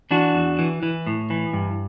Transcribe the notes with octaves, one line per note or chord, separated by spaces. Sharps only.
E3 D4 F#4
E2
E3
E3
A2
E3
G2